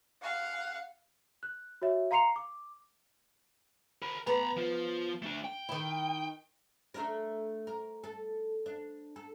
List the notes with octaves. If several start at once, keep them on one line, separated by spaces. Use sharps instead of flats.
F5 F#5
F#6
F#4 C#5 E5
F5 A#5 C6 C7 C#7 F7
D6
A#4 B5
B3 A#5 B5
F3 F4
A3 D4
G5
D#3 E4
A3 D4 A#4
A#4
A4
D4
A4